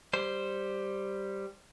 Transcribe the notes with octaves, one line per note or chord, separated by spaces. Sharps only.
G3 C5